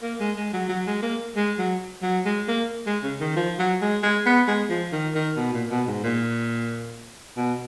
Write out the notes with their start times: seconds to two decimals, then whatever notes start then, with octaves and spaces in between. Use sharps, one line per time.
0.02 A#3
0.20 G#3
0.37 G#3
0.53 F#3
0.69 F#3
0.87 G#3
1.03 A#3
1.36 G#3
1.58 F#3
2.02 F#3
2.25 G#3
2.48 A#3
2.86 G#3
3.03 C#3
3.20 D#3
3.36 F3
3.59 F#3
3.82 G#3
4.03 G#3
4.26 B3
4.48 G#3
4.70 F3
4.92 D#3
5.15 D#3
5.37 B2
5.53 A#2
5.70 B2
5.87 G#2
6.03 A#2
7.37 B2